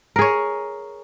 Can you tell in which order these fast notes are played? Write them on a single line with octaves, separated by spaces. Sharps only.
A#4 G#4 C#5